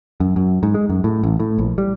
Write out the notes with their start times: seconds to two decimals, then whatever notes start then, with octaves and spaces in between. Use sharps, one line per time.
0.20 F#2
0.36 F#2
0.63 G#2
0.74 G#3
0.89 F#2
1.04 A2
1.23 A1
1.40 A2
1.58 A#1
1.78 G3